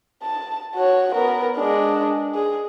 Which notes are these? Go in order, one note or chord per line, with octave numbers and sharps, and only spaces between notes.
A5
F#4 C#5
B3 A#4
G#3 D4
G#4